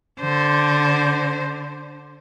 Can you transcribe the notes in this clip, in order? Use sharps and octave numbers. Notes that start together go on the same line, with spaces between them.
D3 C5